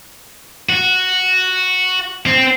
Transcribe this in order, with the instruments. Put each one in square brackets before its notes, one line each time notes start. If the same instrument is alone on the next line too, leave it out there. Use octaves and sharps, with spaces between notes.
[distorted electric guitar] F#4
C4